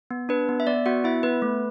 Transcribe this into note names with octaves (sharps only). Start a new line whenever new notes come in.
B3
D4 B4
B3
E5
B3 D5
B3 F#4 F#5
B3 E4 E5
B3 B4
A3